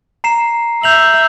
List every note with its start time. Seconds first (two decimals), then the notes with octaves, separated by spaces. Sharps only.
0.24 A#5 C7 E7
0.83 E5 G6 F7 F#7